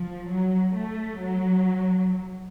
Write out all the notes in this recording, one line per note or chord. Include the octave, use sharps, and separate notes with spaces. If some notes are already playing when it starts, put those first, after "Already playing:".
Already playing: F3
F#3
A3
F#3